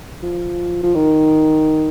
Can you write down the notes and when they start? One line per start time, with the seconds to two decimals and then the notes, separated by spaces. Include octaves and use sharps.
0.23 F3
0.83 F3
0.95 D#3